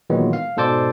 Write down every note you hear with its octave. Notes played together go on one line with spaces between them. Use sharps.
A#2 D#3 E3 F#3 G#3 B3
F5
G#2 B2 A4 C5 D5 D6